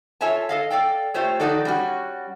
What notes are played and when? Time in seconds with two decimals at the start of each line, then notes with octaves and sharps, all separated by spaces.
0.21 F4 A4 C#5 E5 G#5 A5
0.49 A4 D#5 F5
0.70 A4 D5 F5 G5
1.14 A3 F4 G4 C5 C#5
1.40 D#3 F3 D#4 F#4 A4 D5
1.65 G3 C#4 F#4